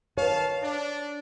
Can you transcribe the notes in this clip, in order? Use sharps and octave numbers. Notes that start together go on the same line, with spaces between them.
D#3 B4 C#5 F5 A5
D4